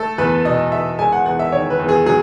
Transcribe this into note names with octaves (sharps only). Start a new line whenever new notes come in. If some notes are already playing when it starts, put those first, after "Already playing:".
Already playing: A3 A4
E2 B4
B2 D#5
E2 E5
G#3 G#5
F#5
E2 F#5
E5
D#3 C#5
B4
E2
G#4
F#3 G#4